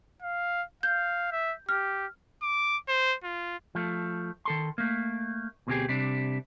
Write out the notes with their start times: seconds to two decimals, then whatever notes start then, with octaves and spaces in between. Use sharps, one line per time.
0.22 F5
0.83 F5 G6
1.32 E5
1.69 G4 F6
2.43 D6
2.88 C5
3.24 F4
3.75 F3 A3
4.45 D#3 A4 C6
4.78 A3 A#3
5.67 D2 B2 C4 E4 G4 G#4
5.89 C3 G3 D4